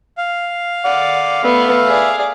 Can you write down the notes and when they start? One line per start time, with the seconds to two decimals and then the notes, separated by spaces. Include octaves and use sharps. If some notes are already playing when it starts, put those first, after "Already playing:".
0.18 F5
0.85 D5 F#5
1.44 A3 B3 B4 E5
1.87 G#4 D5